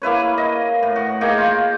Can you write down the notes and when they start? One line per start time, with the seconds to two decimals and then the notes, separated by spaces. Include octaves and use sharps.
0.02 A#3 E4 B4 C#5
0.38 D#5
0.83 A2
0.96 F#4
1.21 A#3 D#4 G#4 G5
1.38 F4